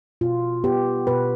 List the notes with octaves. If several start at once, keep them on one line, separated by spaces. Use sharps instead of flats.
B2 F4
B3 G4
B2 B4